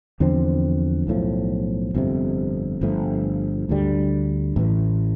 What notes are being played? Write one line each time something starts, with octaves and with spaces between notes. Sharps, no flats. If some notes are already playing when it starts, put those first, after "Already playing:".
E2 D3 F3 C4
B1 A2 F3
G1 F2 C3
G1 G2 F3 A3
D2 D3 G3
A1 A2 E3